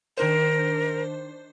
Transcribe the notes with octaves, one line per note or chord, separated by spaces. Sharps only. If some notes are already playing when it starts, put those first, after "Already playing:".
D#3 D4 A#4 C5